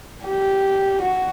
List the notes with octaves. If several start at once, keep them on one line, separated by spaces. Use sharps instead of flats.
G4
F#4